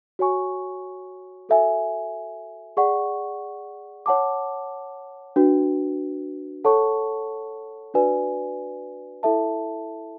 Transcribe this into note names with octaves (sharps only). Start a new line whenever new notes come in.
F#4 C#5 G#5 C#6
F#4 A4 E5 G#5
G#4 D5 F#5 C#6
C#5 F#5 A5 D6
D4 F#4 B4
A4 C#5 F#5 A5 C#6
D4 F#4 B4 D5 G#5
E4 A4 E5 A5